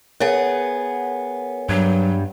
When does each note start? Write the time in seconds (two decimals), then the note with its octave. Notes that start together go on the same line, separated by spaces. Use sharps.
0.20 B3 G#4 A#4 C#5 F#5
1.69 G2 F#3